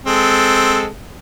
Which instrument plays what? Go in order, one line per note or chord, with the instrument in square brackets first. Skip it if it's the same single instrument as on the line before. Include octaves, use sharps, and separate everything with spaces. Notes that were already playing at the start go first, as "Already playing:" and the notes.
[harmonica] G#3 C4 A4